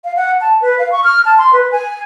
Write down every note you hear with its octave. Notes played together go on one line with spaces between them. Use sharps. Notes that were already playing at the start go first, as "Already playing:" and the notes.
F5
F#5
A5
B4
F5
C#6
F6
A5
C6
B4
G#5